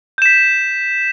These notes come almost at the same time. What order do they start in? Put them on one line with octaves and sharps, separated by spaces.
G6 E7 B6